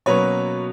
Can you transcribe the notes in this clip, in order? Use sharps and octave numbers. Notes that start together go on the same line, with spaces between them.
B2 F#3 A#3 C#4 B4 C#5